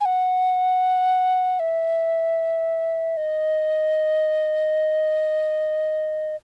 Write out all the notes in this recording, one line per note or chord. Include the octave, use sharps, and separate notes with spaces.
G#5
F#5
E5
D#5